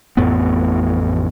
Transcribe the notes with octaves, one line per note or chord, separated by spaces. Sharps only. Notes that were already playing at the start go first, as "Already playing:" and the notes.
A1 F2 A2 B3